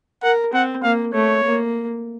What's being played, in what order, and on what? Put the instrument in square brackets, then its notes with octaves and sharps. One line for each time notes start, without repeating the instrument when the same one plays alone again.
[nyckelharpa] A#4 [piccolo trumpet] F#5
[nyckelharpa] C4 [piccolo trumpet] F#5
[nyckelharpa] A#3 [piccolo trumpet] F5
[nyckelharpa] A3 [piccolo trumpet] C#5
[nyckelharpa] A#3